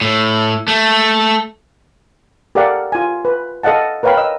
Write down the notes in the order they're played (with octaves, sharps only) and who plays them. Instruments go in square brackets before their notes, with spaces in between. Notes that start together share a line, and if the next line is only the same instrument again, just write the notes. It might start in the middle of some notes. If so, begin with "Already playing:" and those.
[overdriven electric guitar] A2
A3
[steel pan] G4 A4 A#4 D5 F5 F#5
F4 G#5
B4
A4 D#5 F5 F#5 A5
A#4 B4 C#5 F5 G5 B5
D#5 E6